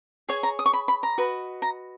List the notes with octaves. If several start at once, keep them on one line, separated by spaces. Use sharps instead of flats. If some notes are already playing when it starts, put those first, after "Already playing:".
G#4 C#5 G#5
A#5
D#6
C#6
B5
B5
A#5
F#4 B4 D#5
A#5